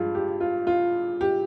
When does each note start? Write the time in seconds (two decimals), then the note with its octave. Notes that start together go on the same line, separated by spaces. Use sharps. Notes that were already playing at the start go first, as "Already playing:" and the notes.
Already playing: G2 F3 G#3 F4
0.15 G4
0.40 F4
0.67 F4
1.21 G4